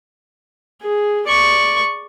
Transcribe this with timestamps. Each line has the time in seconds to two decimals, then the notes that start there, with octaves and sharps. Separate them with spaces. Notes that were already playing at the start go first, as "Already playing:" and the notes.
0.82 G#4
1.28 D5 C#6